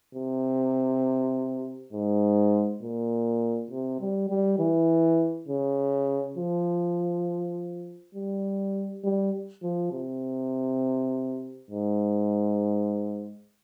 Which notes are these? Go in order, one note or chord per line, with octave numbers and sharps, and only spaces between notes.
C3
G#2
A#2
C3
G3
G3
E3
C#3
F3
G3
G3
F3
C3
G#2